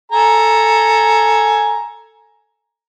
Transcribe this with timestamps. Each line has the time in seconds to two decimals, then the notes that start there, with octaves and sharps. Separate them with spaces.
0.12 A4 G#5 A#5